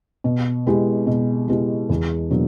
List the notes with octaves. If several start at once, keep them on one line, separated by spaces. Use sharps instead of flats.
B2
G#3 B3 E4 G4
B2
G#3 B3 E4 G4
E2
B2 F#3 A#3 D4